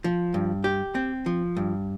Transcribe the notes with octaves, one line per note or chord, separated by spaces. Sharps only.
F3
G2
G4
C4
F3
G2